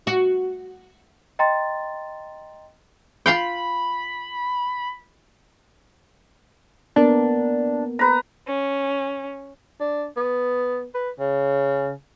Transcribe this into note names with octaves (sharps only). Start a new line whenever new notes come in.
F#4
D#5 G5 A#5 C6 A6
F4 F5 G5 B5
A#3 B3 D4 A#4
B4 A#5
C#4
D4
B3
B4
C#3